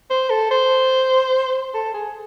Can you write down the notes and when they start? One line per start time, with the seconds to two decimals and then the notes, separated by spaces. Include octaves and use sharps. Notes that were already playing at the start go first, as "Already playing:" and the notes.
0.10 C5
0.30 A4
0.51 C5
1.74 A4
1.94 G#4